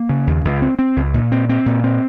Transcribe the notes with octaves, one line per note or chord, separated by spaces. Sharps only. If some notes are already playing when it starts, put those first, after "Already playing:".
Already playing: A#3
C#3
D#2
C#2
C4
C4
C#2
A#2
C4
C4
A#2
C4